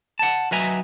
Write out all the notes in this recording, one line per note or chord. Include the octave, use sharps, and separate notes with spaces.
F#5 A5
F#3 B4 D#5 E5 G#5 A#5